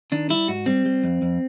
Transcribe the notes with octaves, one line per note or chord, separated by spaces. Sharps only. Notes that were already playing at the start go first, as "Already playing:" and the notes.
D#3 D4
G3 E4
G#2 F#4
G3 C4
G3
F2
F2